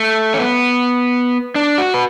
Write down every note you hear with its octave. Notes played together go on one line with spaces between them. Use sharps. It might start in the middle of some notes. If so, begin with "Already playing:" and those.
Already playing: A3
C#4
B3
D4
F#4
B4